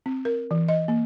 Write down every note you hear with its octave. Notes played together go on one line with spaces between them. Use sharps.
C4
A#4
E3
D#5
A#3